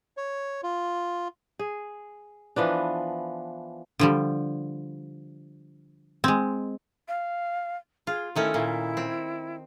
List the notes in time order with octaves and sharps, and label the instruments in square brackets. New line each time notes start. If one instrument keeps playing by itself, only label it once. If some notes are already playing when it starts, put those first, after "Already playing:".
[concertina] C#5
F4
[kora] G#4
E3 F3 B3 D4
[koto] D3 F3 G3
G#3 C4
[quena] F5
[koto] F4 [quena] G#4
[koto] D#3 A3 C#4 [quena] E4
[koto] A#2 [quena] E4
[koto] C4